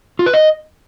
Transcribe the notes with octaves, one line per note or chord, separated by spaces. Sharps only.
F4
B4
D#5